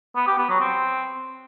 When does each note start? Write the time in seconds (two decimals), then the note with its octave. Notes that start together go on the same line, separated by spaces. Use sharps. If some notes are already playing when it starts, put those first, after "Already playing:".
0.16 B3
0.27 G4
0.38 B3
0.49 F#3
0.61 C4